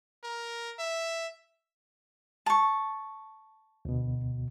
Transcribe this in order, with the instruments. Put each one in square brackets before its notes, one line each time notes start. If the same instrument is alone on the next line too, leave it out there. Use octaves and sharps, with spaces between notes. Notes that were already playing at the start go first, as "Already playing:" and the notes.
[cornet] A#4
E5
[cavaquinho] A5 C#6
[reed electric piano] D2 B2